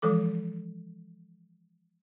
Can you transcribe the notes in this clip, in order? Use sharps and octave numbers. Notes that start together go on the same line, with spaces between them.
E3 F3 G#3 A4 D6